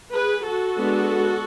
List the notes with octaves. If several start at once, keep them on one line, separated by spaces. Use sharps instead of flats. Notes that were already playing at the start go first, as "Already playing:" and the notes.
G#4 B4
F#4 A4
G#3 B3 D4